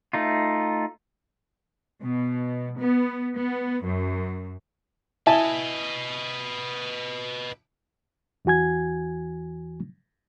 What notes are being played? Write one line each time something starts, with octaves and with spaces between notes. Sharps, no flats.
A3 D#4 F4
B2
B3
B3
F#2
E4 B4 D#5 G#5 A5
E2 E3 F#4 G#5 G#6